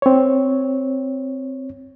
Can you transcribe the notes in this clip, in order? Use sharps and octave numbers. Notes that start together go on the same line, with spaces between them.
C4 C#5